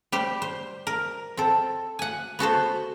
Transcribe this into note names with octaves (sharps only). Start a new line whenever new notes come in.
G3 G4 C5
C5
A#4
C4 A4
F#5 G#5
B3 F#4 A4 C5